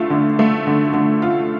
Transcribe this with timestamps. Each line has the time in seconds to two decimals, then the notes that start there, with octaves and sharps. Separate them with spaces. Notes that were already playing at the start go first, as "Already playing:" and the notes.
Already playing: D3 A3 F4
0.10 D3
0.39 A3
0.67 D3
0.94 D3
1.22 F4